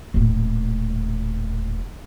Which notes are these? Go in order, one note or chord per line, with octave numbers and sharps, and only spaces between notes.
D#1 A2